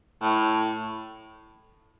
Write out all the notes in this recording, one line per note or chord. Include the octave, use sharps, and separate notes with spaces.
A2